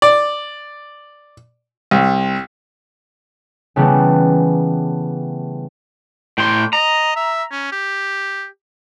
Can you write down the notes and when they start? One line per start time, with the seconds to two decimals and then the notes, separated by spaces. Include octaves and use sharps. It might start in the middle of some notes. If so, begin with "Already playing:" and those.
0.02 D5
1.91 C2
3.76 C#3 E3 G3 A3 B3
6.38 A2 G5 C6
6.73 D#5 A#5
7.16 E5
7.52 C#4
7.72 G4